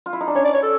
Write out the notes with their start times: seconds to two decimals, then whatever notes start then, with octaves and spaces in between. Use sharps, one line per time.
0.06 F4
0.13 E4
0.21 D#4
0.27 D4
0.35 C#4 C#5
0.44 D5
0.53 C#5
0.63 A4